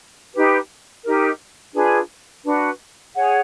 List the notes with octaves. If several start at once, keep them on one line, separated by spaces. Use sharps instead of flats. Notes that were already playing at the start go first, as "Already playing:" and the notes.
D#4 G4 B4
D#4 G4 A#4
D4 F4 G#4 B4
D4 F#4 B4
G#4 C#5 F#5